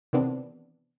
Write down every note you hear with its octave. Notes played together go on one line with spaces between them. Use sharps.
C3 D#3 E3 B3 C4 D4